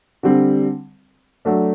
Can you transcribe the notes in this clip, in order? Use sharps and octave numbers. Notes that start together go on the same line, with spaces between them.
D3 G3 C4
F#3 A3 D4